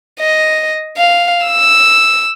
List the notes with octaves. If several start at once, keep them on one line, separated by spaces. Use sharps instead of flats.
D#5
F5
E6